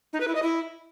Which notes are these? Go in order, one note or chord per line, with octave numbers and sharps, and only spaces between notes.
D#4
B4
E4
D#5
E4